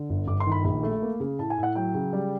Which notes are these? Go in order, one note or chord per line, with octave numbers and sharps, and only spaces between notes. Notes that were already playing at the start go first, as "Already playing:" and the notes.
Already playing: D3
G1
G1 D6
C6
D#3
B5
A#1 B5
A3
A#3
C#3
A2 A5
G#5
A2
F#5
F#3 G5
C#3
G3